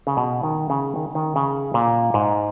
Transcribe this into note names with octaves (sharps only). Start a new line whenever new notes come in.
C#3
B2
D#3
C#3
D#3
D#3
C#3
A#2
G#2